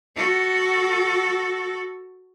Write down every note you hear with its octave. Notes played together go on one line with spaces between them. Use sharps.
F#4 A4